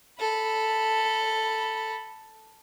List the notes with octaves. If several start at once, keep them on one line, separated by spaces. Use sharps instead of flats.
A4 B5